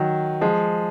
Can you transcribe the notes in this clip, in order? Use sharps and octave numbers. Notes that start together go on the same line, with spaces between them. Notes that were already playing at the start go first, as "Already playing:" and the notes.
Already playing: D#3 F#3
F3 G#3